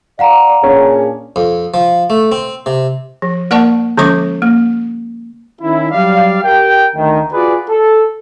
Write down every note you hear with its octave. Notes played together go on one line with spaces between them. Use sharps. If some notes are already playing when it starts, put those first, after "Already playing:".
D5 F5 F#5 A#5
A#2 C#4 D4 G#4
F2
F3
A3
C4
C3
F3
A#3 A#4 D5 F#5 A5 C#6
D3 F3 G#3 C#4 C#6 D6
A#3
D#3 C#4 E4
F#3 G3 D5 F5
G4 A#4 G5
D2 D#3
F4 F#4 G#4 B4 D5
A4